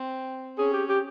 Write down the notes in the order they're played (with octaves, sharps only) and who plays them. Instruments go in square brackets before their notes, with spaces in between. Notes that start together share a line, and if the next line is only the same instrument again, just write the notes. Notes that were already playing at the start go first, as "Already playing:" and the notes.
Already playing: [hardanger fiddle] C4
[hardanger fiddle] C#4 [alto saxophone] G#4
[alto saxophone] G4
G4